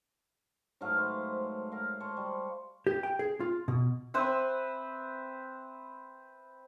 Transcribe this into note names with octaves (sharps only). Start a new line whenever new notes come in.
G#2 F#3 A3 F5
B4 C5
A#4 F5
C5 C#5 A5
G3
G4
G5
G#4
F4
B2
C4 B4 C5 E5